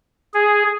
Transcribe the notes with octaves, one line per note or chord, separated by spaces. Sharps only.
G#4